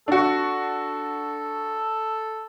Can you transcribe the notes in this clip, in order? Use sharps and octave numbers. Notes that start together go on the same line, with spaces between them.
D4 F#4 A4